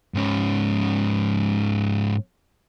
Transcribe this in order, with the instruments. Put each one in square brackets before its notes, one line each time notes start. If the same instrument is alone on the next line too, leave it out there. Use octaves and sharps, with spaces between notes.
[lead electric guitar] G#2 C#4